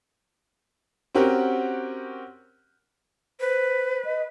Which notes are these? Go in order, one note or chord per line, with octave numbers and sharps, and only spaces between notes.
C4 C#4 F#4 G4 A#4 F#5
B4 C5
D#5